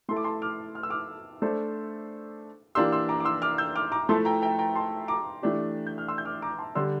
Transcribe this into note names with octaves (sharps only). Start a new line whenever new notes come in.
A3 E4 A4 C6
D6
A5 C6
D6 F6
F6
E6
D6 F6
A3 D4 A4 C5
E3 A#3 D4 G4 C6 E6
C6 E6
A#5 D6
D6
C6 E6
D6 F6
E6 G6
D6 F6
A#5 D6
F3 A3 E4 A4 A5 C6
G5 A#5
G5 A#5
G5 A#5
A5 C6
A#5 D6
E3 A3 D4 G4
G6
F6
C6 E6
G6
D6 F6
A#5 D6
A5 C6
D3 G3 D4 G4 C6 E6